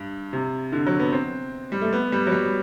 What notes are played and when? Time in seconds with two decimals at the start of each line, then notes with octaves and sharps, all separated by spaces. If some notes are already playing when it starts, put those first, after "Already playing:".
Already playing: G2
0.33 C3
0.72 D3
0.87 F#3
0.99 B3
1.12 C4
1.72 G3
1.82 A3
1.93 B3
2.12 G3
2.27 F#3
2.32 G3